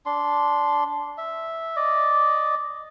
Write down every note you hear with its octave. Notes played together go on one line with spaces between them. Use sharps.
D4 C6
E5
D5 D#5